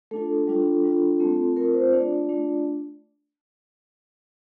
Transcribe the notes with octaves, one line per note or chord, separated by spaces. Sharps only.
A3 D4 F4 A4
G3 D4 F4
G3 D4 F4
A3 C4 F4
A3 C4 F4 A#4
C5
A3 D4 F4 D5
A3 D4 F4